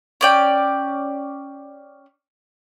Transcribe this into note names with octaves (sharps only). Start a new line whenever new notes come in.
C#4 D5 G5